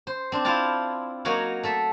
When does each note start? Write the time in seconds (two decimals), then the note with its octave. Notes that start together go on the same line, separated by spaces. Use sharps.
0.07 C5
0.32 C4 D4
0.45 E4 F4 F5 G5 A5
1.25 F#3 A#3 D#4 F#4 C#5 F5
1.63 A3 A4 E5